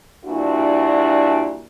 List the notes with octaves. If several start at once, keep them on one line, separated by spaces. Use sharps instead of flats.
G2 A#2 D4 E4 F#4